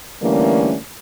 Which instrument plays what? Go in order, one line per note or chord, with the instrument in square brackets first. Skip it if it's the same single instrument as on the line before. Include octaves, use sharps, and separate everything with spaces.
[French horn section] D3 E3 G3 A3 A#3 C#4